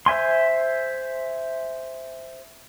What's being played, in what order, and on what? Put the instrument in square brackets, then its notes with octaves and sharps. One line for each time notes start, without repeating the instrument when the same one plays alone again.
[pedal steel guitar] C5 E5 G#5 C6